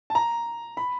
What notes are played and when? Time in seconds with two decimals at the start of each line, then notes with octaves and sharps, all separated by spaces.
0.10 A5
0.15 A#5
0.77 B5